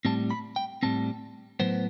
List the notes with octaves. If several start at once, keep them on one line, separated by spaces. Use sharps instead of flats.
A2 G3 C4 A5
B5
G5
A2 G3 C4 A5
A2 F#3 B3 C5